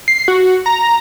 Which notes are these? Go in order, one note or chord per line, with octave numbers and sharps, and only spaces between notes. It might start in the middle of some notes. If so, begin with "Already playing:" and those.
C7
F#4
A#5